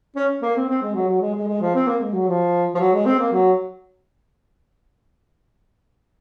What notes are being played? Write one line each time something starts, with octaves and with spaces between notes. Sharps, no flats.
C#4
A#3
C4
C4
G#3
F#3
F#3
G#3
G#3
G#3
F3
C4
A#3
G#3
F#3
F3
F3
F#3
G#3
C4
A#3
F#3